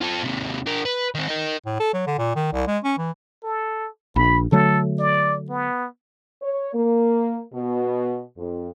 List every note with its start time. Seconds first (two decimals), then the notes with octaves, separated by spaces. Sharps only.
0.01 F4 A4
0.24 D#2 C3
0.66 D4 A#4
0.85 B4
1.15 D#3 C4
1.28 A#4 D#5
1.66 A2
1.80 A4
1.93 F#3
2.07 D3
2.18 A#2
2.36 D#3
2.53 C2
2.67 G#3
2.84 C#4
2.98 E3
3.44 A4
4.16 A#1 B5
4.52 D3 F#3 A3 A4
4.99 D5
5.50 B3
6.42 C#5
6.73 A#3
7.53 B2
8.38 F2